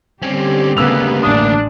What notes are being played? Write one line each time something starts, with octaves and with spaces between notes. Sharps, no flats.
D3 G3 C4 C#4 G4
D2 C#3 A#3 B3 E6 F7
A1 D4 D#6